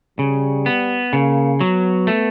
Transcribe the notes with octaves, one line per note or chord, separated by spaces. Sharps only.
C#3 G3
B3
C#3 A#3
F#3 B3
A3